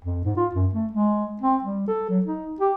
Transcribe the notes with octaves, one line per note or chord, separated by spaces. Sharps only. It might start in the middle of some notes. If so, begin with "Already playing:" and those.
F2
G#2
F4
F#2
A3
G#3
C4
G3
A4
F#3
D#4
G4